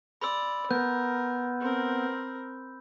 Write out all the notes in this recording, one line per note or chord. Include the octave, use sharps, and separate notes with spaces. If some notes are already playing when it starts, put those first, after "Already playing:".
D5 B5 C6 E6
B3 A#4 G6
C4 A#4